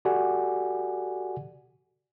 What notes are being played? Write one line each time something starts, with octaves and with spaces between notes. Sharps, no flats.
F#4 G4 A4 D5 F#5 G#5